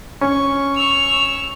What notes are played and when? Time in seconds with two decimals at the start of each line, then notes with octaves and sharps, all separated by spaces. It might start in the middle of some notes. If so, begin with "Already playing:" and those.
0.21 C#4 C#6
0.76 C#6 E6 F7